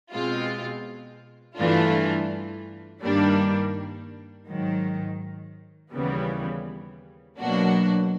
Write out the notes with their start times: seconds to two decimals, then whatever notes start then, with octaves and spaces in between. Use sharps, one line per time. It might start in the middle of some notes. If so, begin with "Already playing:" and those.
0.14 B2 G#3 C4 F4
1.58 G2 E3 A3 D4 F4
3.03 G2 D#3 G3 A#3 D4
4.48 G#2 D#3 F#3
5.93 D#2 C#3 E3 G3 B3
7.38 B2 F#3 A#3 D4 F#4